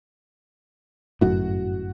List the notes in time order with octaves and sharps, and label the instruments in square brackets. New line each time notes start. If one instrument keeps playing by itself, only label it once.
[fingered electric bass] G1 F#2 A2 [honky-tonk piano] F#4